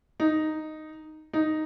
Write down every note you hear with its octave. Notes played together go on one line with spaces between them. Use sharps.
D#4
D#4